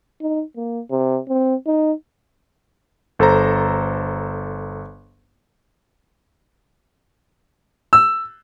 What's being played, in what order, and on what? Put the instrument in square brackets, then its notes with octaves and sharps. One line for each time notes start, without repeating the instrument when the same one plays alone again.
[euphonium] D#4
A#3
C3
C4
D#4
[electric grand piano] G1 A4 C5 A#5
[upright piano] E6